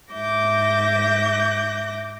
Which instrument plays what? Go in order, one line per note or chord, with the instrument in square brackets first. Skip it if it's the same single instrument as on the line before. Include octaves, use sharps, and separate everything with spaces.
[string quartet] G#2 E5 D6 G6 A#6